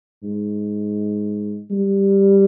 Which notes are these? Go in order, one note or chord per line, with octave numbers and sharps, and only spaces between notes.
G#2
G3